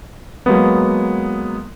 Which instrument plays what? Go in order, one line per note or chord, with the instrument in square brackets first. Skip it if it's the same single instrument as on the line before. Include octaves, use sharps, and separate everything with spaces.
[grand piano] F#3 G#3 A#3 B3